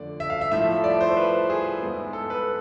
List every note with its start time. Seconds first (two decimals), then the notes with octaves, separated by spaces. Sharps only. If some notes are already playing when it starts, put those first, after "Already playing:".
Already playing: F2 D3 A3 D5
0.20 E5
0.30 F5
0.41 E5
0.52 A2 F3 A3 E5
0.84 D5
1.01 C5
1.17 B4
1.50 G#4
1.81 G#2 G#3 B3
2.13 A4
2.30 B4